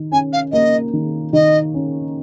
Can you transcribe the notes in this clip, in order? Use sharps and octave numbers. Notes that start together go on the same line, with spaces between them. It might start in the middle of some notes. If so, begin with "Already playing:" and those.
Already playing: D#3
C#4 G#5
F5
A#3 D#5
D#3
D#3 D#5
C#4